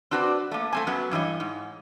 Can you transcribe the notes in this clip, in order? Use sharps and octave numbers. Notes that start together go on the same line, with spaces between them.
C4 D4 F#4 B4 D5
A3 A#3
A3 C4 G#5
F#2 F#3 B3 C#4
G2 E3 C#5 D#5
G#2